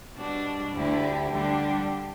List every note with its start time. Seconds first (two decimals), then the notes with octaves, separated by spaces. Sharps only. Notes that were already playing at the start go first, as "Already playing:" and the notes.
0.14 B2 G3 D4 F#4
0.73 D2 D3 A3 E4 G4
1.31 D3 G3 D4 G4